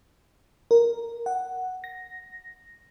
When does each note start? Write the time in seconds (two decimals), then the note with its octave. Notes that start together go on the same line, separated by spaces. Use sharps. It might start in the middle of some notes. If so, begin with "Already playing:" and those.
0.71 A#4
1.26 F#5
1.84 A#6